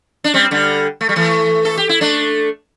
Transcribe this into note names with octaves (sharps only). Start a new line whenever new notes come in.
D4
G3 C4
D3 G3
A3
G3
E3 A3
A4
G4
E4
A3 D4